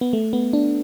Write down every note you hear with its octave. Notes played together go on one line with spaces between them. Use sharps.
B3
A3
B3
D4